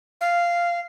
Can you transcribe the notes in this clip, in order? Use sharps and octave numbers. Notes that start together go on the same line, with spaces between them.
F5